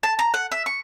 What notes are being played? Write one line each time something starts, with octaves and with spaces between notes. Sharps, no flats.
A5
A#5
F#5
E5
C#6